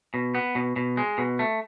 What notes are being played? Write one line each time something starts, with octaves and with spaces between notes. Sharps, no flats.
B2
B3
B2
B2
G#3
B2
A3